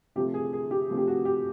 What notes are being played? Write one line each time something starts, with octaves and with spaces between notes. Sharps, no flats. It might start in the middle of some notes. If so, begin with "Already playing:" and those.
C3 F3 A3 G4
G#4
G#4
G4
C3 F3 A3
G4
F#4
G4